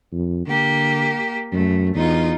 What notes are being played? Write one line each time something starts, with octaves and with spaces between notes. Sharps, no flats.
F2
D3 A#3 G4
F#2 A3
E2 D#4 F4